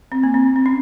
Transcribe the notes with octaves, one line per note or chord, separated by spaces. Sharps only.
C4
A#3
C4
C4
C#4